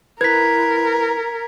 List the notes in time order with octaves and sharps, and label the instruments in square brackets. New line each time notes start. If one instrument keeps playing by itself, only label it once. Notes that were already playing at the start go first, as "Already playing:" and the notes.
[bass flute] E4 [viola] A#4 [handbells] B4 [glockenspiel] G#6 B6